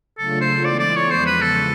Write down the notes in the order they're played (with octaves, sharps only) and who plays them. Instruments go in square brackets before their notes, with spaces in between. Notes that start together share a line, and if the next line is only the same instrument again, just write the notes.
[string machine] C#3 F#3 A3 D4 F4 [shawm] A4
[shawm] C5
[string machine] E3 G#3 B3 E4 A4 [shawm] D5
[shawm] D5
C#5
[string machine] E2 C#3 F3 G#3 B3 [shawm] C5
[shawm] B4
A4